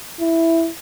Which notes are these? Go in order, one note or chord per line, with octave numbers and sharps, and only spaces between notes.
E4